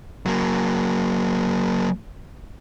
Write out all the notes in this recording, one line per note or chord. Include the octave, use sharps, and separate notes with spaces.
F#3 A#3